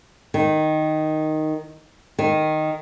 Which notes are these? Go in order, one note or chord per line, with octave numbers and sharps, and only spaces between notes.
D#3
D#3